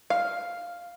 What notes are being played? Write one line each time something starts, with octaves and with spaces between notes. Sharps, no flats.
F5